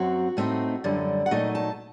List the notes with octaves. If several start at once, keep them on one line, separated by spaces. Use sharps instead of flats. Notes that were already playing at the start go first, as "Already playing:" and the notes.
Already playing: F#2 F#3 C4 F#4
A2 A3 C4 D#4
F#2 D3 G3
F#5
A#2 F#3 A3 D#4 D#5
A5